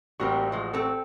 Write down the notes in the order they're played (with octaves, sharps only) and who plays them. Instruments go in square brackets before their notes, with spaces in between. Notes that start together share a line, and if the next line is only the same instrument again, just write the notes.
[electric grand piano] A1 F#4 C#6 [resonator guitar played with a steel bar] G3 A#3 C4
[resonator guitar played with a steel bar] F3 G#3
C4 A4